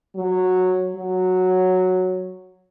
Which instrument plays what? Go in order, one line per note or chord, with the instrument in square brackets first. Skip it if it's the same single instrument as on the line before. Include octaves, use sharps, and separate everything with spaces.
[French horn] F#3
F#3